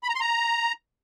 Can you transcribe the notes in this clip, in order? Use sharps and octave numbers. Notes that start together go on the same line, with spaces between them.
B5
A#5
C6
A#5